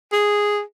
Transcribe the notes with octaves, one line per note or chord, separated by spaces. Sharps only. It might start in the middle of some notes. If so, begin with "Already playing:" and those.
G#4